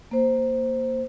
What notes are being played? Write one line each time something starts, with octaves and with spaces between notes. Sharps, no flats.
A#3 C5